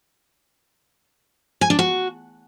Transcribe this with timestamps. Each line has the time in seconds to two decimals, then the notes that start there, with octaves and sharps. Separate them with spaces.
1.61 G#5
1.70 D4
1.79 F#4